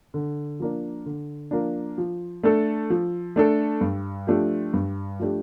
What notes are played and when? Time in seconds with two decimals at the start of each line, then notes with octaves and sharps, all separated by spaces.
0.14 D3
0.60 F3 A#3 D4
1.06 D3
1.51 F3 A#3 D4
1.98 F3
2.43 A3 D4 A4
2.90 F3
3.36 A3 D4 A4
3.81 G2
4.27 F3 A3 D4 G4
4.74 G2
5.20 F3 A3 D4 G4